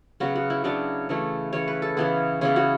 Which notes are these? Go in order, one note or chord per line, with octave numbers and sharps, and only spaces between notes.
C#3 F#3 B3 F#4
F#4
E4
C#3 F#3 B3 D4
C#3 E3 A3
C#3 E3 A3 C#5
B4
A4
C#3 E3 B3 G#4
C#3 E3 B3 G#4
F#4